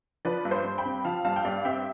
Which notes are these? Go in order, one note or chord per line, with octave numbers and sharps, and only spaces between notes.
F3 B4 D5
G2
C5
G2
G5 B5
C4
F3 F5 A5
G2 F5 A5
G5
G2 D5 F5
C4 E5 G5